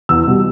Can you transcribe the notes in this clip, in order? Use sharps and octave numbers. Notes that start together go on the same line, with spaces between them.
E2 E6
B2 G3